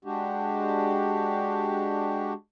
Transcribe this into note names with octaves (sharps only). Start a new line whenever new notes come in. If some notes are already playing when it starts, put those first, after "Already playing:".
G#3 D4 F#4 G4